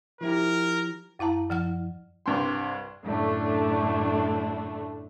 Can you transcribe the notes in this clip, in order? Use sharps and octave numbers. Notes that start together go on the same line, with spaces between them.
F3 E4 G4 A#4
F#2 E4 F5 A5 A#5
F#2 F3 F#5 F6
C2 G2 G5 C6
F#2 A2 D3 A3 D4